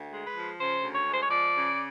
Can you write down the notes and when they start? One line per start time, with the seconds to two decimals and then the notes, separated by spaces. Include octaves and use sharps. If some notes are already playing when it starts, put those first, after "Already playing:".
Already playing: D2
0.11 G#3
0.23 B4
0.35 F3
0.58 C#3 C5
0.83 D2
0.94 C#5
1.06 G#3
1.12 C5
1.21 C#5
1.30 F3 D5
1.54 C#3